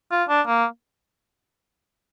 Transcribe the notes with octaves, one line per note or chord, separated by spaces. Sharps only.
F4
D4
A#3